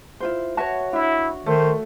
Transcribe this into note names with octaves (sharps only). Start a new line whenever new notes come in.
E4 F4 C5
F#4 B4 C#5 E5 A5
D4 E4 E5
D#3 A3 C5